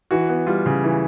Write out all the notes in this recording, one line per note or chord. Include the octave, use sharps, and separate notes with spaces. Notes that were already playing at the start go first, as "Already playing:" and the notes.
E3 F#4
B3
G3 F4
C#3
E3